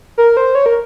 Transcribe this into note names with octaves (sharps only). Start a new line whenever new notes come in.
A#4
C5
C#5
A#4